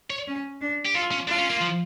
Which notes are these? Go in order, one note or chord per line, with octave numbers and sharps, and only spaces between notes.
C#5
C#4
D4
G4
F4 A4
C#4
D4 F4
C#4
A#3
F3